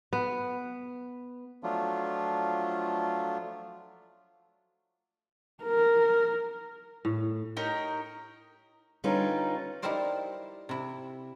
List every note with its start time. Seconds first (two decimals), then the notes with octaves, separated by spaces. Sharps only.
0.13 B3
1.63 F3 F#3 A3 D4 F4
5.63 A#4
7.05 A2
7.57 D#4 G4 A#4 C#5
9.04 D3 G3 C#4 D#4 F4 B4
9.82 D#4 E4 G4 A#4 C5 D5
10.69 C3 E4